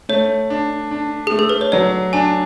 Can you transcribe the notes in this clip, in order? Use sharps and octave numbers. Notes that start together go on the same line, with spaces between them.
A3 C#5
D4
D4
A3 G#4
A4
B4
C#5
F#3 D5
D4 G#5